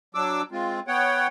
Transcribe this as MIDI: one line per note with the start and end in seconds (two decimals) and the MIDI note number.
0.15 0.42 54
0.15 0.42 62
0.15 0.42 86
0.15 0.42 88
0.52 0.80 56
0.52 0.80 60
0.52 0.80 65
0.88 1.27 59
0.88 1.27 73
0.88 1.27 78
0.88 1.27 79